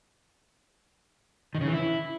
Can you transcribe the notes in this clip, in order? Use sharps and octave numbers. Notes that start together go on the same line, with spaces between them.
D#3
C#3
E3
E4